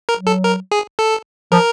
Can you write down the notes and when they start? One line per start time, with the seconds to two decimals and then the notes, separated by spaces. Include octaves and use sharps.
0.09 A#4
0.17 F#3
0.27 A4
0.44 A#4
0.71 G#4
0.99 A4
1.52 F3 A#4